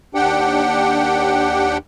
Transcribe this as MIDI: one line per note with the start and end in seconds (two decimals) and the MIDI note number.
0.15 1.77 39
0.15 1.77 62
0.15 1.77 67
0.15 1.77 78
0.15 1.77 79